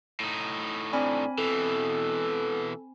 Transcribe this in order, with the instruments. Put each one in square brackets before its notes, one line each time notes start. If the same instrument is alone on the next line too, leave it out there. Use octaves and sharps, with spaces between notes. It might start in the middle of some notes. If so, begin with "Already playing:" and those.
[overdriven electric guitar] A2 D#4
[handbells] C4 G#5 B5 [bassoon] D4
[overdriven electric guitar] B2 E3 [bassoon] A4